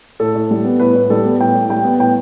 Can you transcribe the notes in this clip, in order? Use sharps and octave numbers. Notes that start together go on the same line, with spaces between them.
A2 A4
A2
G3
B3
A2 B4
A2
G3 A4
B3
A2 G5
A2
G3 G5
B3
A2 G5